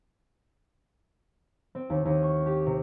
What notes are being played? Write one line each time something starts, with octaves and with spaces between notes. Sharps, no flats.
C4
D#2
D#2
C#6
G4
C3